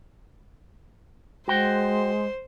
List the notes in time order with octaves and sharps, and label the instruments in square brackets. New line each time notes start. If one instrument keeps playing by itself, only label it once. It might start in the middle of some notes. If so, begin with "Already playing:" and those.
[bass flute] G#3 [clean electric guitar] F#4 G5 [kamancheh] C5